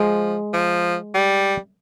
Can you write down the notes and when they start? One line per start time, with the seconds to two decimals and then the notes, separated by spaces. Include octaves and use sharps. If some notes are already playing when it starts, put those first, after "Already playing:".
Already playing: F3 G#3
0.53 F3
1.14 G3